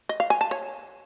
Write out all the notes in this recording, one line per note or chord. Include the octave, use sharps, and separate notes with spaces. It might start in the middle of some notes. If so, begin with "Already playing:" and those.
D#5
F5
G#5
A5
C#5